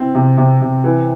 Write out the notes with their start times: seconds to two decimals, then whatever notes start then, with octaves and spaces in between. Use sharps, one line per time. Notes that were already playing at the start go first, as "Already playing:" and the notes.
Already playing: C4 E4
0.15 C3
0.37 C3
0.61 C3
0.84 E3